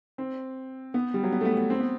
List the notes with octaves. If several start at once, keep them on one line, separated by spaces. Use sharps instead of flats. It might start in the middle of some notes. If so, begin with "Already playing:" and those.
C4
B3
G3
F#3
B3
A3
B3
B3
C4
B3